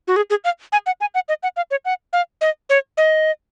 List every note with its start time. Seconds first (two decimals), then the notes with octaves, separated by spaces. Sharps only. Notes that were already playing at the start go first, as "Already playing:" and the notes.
0.08 F#4
0.16 G#4
0.30 G#4
0.44 F5
0.72 G#5
0.86 F#5
1.01 G#5
1.15 F#5
1.29 D#5
1.43 F#5
1.57 F5
1.71 C#5
1.85 F#5
2.13 F5
2.41 D#5
2.70 C#5
2.97 D#5